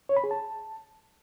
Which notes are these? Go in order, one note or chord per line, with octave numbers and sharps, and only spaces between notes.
C#5
B5
G#4
A5